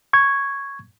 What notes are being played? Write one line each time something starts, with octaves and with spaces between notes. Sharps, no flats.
C#6 G#6